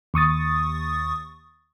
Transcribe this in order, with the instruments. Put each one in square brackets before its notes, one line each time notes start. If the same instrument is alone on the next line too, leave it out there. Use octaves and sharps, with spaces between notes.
[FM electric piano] D#2 C#6 D#6 A6